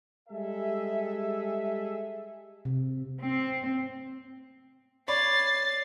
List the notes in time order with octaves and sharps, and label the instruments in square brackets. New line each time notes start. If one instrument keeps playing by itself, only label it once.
[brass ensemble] G3 G#3 G#4 A4 E5
[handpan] C3
[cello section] C4
[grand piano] C#5 D5 B5 [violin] A6 C7